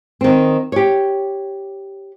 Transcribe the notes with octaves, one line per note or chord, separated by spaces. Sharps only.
D#3 C4
G4 C#5